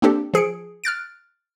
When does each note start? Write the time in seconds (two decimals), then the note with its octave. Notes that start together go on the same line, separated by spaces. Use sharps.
0.02 A#3 C4 D4 G4 A4
0.34 F3 G#4 C#7 D7
0.84 F6 F#6 A6 D7